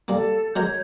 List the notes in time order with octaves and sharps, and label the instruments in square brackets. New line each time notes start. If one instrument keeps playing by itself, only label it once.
[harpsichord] G3 A#3 [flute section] A4
[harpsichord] F#3 G#3 A#4 [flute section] C#5 G6